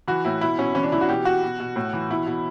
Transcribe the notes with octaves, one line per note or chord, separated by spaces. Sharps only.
E3 F#4
A2 E4
B2 E4
B2 C#4
E3 C#4
D4
E3 E4
F#4
B2 G4
B2 F#4
B2
B2
A2
E3
B2 E4
B2